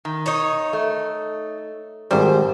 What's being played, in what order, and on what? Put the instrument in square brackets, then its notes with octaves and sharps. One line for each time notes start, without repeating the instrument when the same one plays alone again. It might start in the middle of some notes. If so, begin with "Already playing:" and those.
[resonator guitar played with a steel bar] D#3
[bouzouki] D#4 C#5
[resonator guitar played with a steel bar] A3
[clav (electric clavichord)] G#1 G3 [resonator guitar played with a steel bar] F#2 [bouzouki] C5